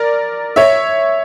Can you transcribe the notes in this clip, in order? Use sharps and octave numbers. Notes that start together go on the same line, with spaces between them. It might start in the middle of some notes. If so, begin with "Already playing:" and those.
Already playing: A#4 D5
C#5 E5